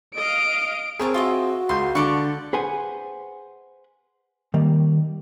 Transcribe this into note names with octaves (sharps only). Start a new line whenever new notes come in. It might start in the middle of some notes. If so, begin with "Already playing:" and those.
D#5 F5 D7
C4 G#4 A#4 C#5 A5
F4 F#4 D#5 E5
C#2 C6 G6
D3 A4 D5 C#6
G#4 B4 C5 F#5 G#5
D#3 G3 A#3